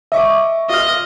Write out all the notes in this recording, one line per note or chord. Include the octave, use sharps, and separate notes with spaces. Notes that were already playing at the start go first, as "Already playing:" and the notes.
D#5 E5 C#6 D6
F4 D#5 F6